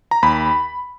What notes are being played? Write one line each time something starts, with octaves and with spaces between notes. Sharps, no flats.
A#5
D#2 B5